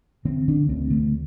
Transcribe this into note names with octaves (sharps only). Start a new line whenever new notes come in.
D3 C4
D3 D4
D2 C4
D3 A3